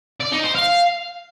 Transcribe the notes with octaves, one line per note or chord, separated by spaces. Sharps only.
D5
D#4
C5
F5